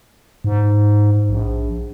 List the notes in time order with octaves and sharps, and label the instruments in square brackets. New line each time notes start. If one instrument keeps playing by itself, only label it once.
[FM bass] G#2
A#1